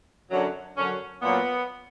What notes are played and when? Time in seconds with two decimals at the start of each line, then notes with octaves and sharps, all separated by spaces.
0.30 F#2 D3 F#3
0.76 F#2 D3 F#3 C#4
1.22 A#2 F#3 B3